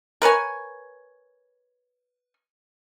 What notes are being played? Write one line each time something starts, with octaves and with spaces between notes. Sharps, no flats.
A#4 B4 C#5 G#5